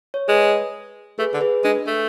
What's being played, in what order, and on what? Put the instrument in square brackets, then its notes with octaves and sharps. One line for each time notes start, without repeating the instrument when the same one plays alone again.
[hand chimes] C#5
[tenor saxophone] G#3 [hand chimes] G#4 B4
[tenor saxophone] A3 [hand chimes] G#4 B4
[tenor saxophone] D3
[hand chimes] G#4 B4
[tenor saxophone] G#3 [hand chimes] D4
[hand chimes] D4
[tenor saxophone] A3